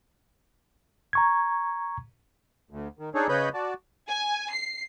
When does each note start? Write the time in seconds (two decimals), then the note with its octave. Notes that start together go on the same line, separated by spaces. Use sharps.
1.13 A#5 C#6 G#6
2.71 D2
2.99 D#3
3.15 D4 D#4 G#4 A4 C#5
3.29 C#3 B4 C#5 D#5 B5 G6
3.54 F#4 D5 A5
4.09 G#5
4.53 C7